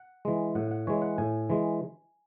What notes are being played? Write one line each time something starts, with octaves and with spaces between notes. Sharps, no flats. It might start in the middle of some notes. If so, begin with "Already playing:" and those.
Already playing: F#5
E3 G#3
A2 F#5
F#5
E3 G#3 C#5
F#5
A2 G#5
E3 G#3